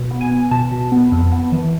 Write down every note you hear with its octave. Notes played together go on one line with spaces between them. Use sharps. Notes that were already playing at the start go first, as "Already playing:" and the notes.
Already playing: B2
B3
G#5
B3
B2 A5
B2
B3
F2
B3
E3